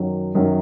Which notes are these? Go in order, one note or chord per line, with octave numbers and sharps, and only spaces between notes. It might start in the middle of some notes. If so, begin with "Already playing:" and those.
Already playing: F#2 D#3 F#3
F#2 D#3 F#3